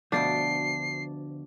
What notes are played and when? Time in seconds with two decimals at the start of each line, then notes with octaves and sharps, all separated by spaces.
0.12 D2 B2 F3 D4 C7